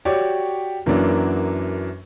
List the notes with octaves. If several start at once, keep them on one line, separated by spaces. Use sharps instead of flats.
F#4 G4 C#5 D5
F#2 E3 F#3 A#3 D4